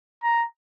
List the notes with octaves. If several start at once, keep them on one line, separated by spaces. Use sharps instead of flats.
A#5